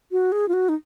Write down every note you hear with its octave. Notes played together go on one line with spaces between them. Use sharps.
F#4
G#4
F4
F#4
D#4